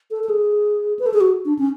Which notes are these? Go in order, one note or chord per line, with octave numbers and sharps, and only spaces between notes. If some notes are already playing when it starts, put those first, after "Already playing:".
A4
A4
G#4
B4
A4
G#4
F#4
D4
C#4